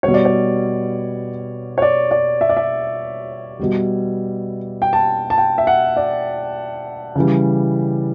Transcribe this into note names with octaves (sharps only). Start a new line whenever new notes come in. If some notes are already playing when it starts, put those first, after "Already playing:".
B2 G3 C#5
D5
C#5
C#5
D5
D5
E5
D5
E5
B2 G3
G5
A5
A5
G5
E5
F#5
D5
C#3 E3 G3